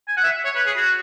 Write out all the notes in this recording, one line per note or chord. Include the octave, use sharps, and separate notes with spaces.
G#5
F#5
E5
C#5
B4
G#4
F#4